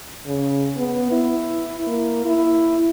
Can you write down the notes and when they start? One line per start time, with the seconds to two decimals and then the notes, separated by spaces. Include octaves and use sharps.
0.26 C#3
0.76 B3
1.12 E4
1.87 A#3
2.25 E4